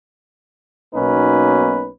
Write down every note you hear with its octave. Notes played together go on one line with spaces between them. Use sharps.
B1 B2 A#3 C#4 D#4 B4